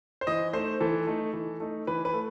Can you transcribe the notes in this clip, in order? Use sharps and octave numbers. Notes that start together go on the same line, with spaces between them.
C5
E3 D#5
A3 D#4 C5
E3 A4
A3 D#4
E3
A3 D#4
E3 B4
B4
A3